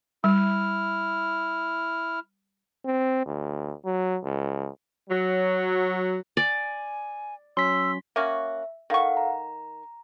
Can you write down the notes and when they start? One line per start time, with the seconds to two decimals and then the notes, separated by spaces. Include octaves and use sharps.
0.24 G3 E4 F6
2.85 C4
3.26 D2
3.85 F#3
4.24 C#2
5.10 F#3
6.37 D5 G#5
7.57 F#3 C#4 C6 E6 B6
8.16 A#3 C#4 F#4 E5
8.90 D#3 A4 F5 F#5 C#6
9.17 A#5